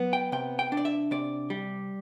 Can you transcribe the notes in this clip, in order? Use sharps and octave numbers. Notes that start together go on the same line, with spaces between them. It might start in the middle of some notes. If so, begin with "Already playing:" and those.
Already playing: F#3 B3
G5
C3 G5
G5
D4
D5
E5
C3 D5
G3